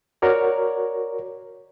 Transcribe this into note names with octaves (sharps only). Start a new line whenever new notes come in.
F#4 A#4 C#5 D5